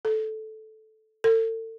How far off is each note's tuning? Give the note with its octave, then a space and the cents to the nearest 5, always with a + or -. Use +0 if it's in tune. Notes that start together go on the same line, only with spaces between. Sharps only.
A4 -10
A4 +35